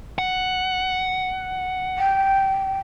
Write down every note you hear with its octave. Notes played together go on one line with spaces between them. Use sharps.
F#5
G5